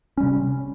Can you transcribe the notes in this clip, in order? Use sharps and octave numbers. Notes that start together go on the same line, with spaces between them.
C3 G3 C#4